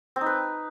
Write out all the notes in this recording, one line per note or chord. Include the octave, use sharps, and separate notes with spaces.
C4
D#4
B4